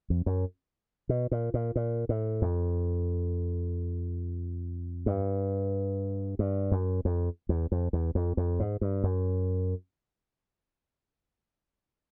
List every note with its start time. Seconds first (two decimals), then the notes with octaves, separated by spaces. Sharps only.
0.10 F2
0.26 F#2
1.09 B2
1.31 A#2
1.54 A#2
1.76 A#2
2.09 A2
2.42 F2
5.06 G2
6.39 G2
6.72 F#2
7.05 F2
7.49 E2
7.72 F2
7.93 E2
8.15 F2
8.37 F2
8.60 G#2
8.81 G2
9.04 F#2